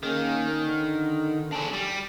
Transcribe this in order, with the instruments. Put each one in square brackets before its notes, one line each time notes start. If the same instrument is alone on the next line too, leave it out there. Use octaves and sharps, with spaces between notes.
[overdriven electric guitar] D#3 [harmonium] A#3 C#4 G#4
[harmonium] D3
[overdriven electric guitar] D4 G#4
G3